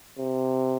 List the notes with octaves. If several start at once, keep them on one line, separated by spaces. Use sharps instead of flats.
C3